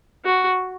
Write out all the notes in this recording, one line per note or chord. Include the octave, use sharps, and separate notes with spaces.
F#4